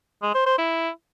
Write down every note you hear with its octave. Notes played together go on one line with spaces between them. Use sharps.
G#3
C5
C5
E4